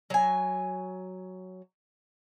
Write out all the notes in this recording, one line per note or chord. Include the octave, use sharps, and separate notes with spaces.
F#3 G#5